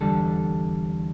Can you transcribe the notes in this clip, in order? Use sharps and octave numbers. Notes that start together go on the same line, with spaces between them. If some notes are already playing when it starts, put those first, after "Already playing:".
E2 D3 G3 A4